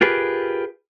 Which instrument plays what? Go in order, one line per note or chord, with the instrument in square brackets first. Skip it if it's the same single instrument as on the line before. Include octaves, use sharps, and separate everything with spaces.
[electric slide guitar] F4 G4 G#4 A#4 B4